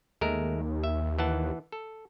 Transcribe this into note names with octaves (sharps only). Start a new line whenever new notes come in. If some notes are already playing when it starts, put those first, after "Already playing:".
D#2 G#3 A3 A#4
E5
E3 F#5 A5
A4